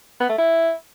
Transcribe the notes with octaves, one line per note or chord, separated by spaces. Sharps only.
B3
A3
E4